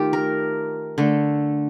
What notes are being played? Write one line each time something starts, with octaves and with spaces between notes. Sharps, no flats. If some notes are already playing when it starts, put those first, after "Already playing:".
Already playing: D#3 A3 F4 G4
A#4
D3 A3